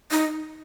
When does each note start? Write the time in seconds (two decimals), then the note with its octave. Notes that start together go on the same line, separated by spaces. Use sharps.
0.11 D#4